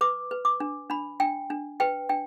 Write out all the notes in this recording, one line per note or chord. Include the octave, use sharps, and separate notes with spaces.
B4 D6
B4
D6
D4
D4 B5
D4 G5
D4
B4 G5
D4 G5